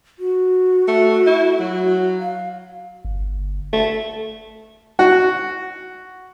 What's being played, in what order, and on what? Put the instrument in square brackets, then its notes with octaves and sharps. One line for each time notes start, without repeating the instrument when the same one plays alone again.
[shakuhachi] F#4
[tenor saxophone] A3
E4
F#3
[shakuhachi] F5
[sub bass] G1
[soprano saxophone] A3
[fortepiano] F#4